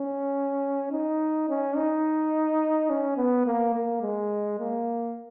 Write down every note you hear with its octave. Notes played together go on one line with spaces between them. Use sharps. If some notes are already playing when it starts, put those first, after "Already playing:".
Already playing: C#4
D#4
C#4
D#4
C#4
B3
A#3
A#3
G#3
A#3